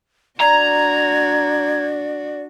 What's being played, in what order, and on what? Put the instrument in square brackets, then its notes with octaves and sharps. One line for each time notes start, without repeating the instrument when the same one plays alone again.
[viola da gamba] D4 F#4 [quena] D5 [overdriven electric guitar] A#5 [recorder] G#6